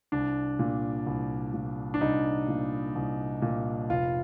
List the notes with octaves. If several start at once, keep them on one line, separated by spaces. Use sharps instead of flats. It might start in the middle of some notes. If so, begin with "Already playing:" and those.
C2 D4
A#2
C2
A#2
D4
C2 D#4
A#2
C2
A#2
F1 F4